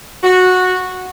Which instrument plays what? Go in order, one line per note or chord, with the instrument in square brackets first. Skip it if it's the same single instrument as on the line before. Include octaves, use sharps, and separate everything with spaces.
[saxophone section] F#4